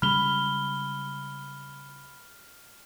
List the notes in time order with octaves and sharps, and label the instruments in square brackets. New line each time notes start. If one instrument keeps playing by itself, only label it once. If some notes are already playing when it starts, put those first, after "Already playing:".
[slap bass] C#3 G3 G#3 [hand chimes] B5 [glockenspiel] F6 G7